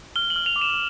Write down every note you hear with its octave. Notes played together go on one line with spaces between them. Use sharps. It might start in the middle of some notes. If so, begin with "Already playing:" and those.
F6 G7
F#7
F6
F7
D6
E7